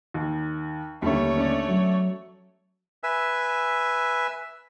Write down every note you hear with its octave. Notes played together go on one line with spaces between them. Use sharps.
D#2
D#2 D3 G3 A3 C#5
C#4 D5
F#3
B4 E5 G#5 E6